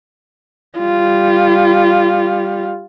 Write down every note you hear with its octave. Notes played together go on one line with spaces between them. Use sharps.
G3 F4